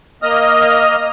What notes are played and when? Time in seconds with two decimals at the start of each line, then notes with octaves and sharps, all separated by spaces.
0.22 A#3 D#5 D#6 F6